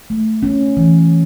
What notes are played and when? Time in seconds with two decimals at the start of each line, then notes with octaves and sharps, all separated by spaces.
0.10 A3
0.43 C#4
0.77 E3